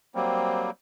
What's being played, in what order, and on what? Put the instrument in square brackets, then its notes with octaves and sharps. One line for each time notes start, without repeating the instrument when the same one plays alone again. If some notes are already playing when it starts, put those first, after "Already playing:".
[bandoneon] F#3 G3 A#3 [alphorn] C4